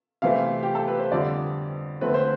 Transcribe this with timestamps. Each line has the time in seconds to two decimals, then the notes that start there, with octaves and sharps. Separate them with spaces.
0.22 C3 E3 A3 C4 F5
0.63 G4
0.75 A4
0.88 B4
1.00 C5
1.12 F2 D3 G3 D5
2.01 E2 D3 A3 C4 B4
2.14 C5